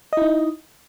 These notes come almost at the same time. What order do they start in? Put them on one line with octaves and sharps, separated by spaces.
D#5 E4 D#4